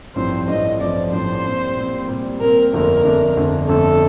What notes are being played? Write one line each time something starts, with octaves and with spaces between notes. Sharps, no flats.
A1 G2 F3 C4 C5
A1 G2 F3 C4 D#5
A1 G2 F3 C4 D5
A1 G2 F3 C4 C5
A#2 G3 C4
A#2 G3 C4
A#2 G3 C4
A#2 G3 C4 A#4
G1 F2 D3 A3 D4 A#4
G1 F2 D3 A3 D4
G1 F2 D3 A3 D4
G1 F2 D3 A3 D4 A4